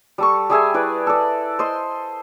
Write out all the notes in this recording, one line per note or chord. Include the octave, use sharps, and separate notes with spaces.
G3 A4 C#6
G3 G#4 E5 G#5
E4 B4 D5
A4 D5
C5 D#5 C6